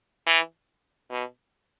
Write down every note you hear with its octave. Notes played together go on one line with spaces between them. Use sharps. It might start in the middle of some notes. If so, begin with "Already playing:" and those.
E3
B2